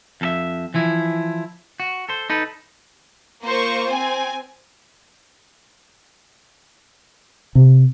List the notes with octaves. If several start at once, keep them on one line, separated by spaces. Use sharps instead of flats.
F2 A4 E5
E3 F3 E4
F#4
A4 C5
D#4 A4 B4
A#3 F4 C5 C#6
C4 G#5
C3